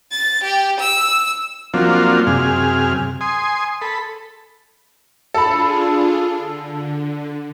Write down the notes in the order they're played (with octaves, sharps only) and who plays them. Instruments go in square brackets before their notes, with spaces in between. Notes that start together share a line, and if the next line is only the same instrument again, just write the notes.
[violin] A6
G4
E6
[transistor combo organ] F3 F#3 A#3 C4 D4 F4
F#2 C3 G#4 F6
G#5 C6 D#6
A4 B5
[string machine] D4 F4 G#4 [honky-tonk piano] A4 B5
[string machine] D3